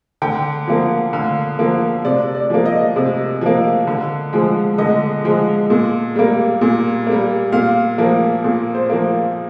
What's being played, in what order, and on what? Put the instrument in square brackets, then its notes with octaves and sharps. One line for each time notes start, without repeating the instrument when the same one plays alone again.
[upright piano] D3 G5
F3 A#3
D3 F5
F3 A#3
C3 D5
D5
F3 A#3
D#5
C3
F3 A#3
D3
F3 G#3
D3 D#5
F3 G#3
A#2
G3 A#3
A#2
G3 A#3
A#2 F5
F3 A#3
A#2
C5
F3 A#3